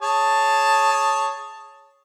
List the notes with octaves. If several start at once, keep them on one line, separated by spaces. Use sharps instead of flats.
G#4 C#5 A5